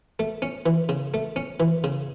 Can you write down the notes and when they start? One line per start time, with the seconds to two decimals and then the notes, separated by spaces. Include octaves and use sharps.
0.19 A3
0.42 C#4
0.66 E3
0.89 C#3
1.14 A3
1.36 C#4
1.60 E3
1.84 C#3